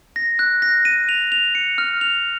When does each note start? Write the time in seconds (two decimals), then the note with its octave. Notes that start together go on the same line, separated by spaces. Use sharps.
0.16 A#6
0.39 F#6
0.62 A#6
0.85 D#7
1.09 F7
1.32 F7
1.55 C#7
1.78 F6
2.01 F7